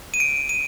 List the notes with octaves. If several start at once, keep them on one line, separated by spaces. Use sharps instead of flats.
D#7
D7
D#7